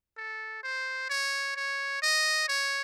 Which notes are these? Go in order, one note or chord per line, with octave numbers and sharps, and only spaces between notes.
A4
C5
C#5
C#5
D#5
C#5